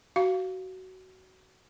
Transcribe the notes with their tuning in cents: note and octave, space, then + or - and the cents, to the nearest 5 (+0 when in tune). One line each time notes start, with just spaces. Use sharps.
F#4 +20 F5 +0